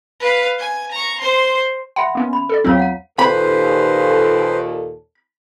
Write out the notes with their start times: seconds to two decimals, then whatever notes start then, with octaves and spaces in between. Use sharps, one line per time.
0.20 B4 F5
0.59 G#5
0.91 A#5 C#6
1.20 C5 C6
1.96 E5 F#5 B5 C6
2.15 A#3 B3 C#4
2.33 B5
2.49 A4 D5
2.64 E2 F#3 C4 F4 C#5 F5
2.77 F5 F#5 A#5
3.19 D#2 A#2 A4 B4 C5 B5